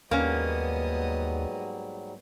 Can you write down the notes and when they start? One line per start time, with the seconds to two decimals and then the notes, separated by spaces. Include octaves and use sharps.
0.11 D#2 G#2 F#3 G3 A#3 B3 C#4 D#5